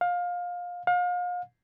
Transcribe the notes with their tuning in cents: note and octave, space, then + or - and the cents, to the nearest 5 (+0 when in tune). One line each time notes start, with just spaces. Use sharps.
F5 +20
F5 +35